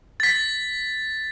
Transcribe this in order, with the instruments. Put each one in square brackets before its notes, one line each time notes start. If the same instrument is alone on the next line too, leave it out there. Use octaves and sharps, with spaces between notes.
[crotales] A6 B6